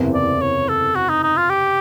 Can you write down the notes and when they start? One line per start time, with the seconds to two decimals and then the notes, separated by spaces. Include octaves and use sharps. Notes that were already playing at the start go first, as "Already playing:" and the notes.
Already playing: F#1 E2 C3
0.14 D5
0.41 C#5
0.69 A4
0.95 F#4
1.09 D#4
1.23 D#4
1.37 F4
1.50 G4